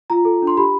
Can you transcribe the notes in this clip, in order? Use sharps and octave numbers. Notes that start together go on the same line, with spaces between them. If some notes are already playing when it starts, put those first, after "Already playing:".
F4 A#5
A4
D4
C6
G4 B5